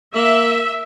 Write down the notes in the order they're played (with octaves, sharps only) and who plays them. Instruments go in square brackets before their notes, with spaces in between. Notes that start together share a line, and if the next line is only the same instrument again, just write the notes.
[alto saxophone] A#3 [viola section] E5